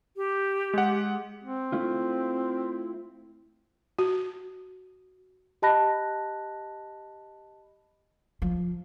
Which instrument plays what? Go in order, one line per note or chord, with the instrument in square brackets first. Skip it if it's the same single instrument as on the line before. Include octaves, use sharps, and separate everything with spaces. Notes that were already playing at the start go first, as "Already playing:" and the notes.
[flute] G4
[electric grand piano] G#3 F#5
[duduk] C4
[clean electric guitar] A3 E4 F4
[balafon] F#4
[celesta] G4 D#5 A5 B5 F#6 A#6
[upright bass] F3